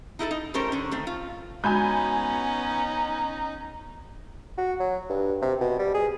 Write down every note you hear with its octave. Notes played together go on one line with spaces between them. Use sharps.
D#4 E4 G#4 A4
D#4
G3 A3 C#4 G4 A#4 C5
D3 C#4
D#3 A3 C4
F4
G#3 B3 C#4 D#4 F#4 G#5 B5 G6
F#4
F#3
G2
C3
B2
G3
G#4